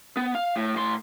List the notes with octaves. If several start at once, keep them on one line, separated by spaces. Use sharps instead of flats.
B3
F5
A2
A2 C6